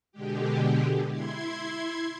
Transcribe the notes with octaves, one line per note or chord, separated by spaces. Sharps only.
B2 D3 G#3 G4
E4 C6 G#6